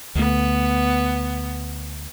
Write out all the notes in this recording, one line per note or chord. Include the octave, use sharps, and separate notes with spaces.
D2 A3 B3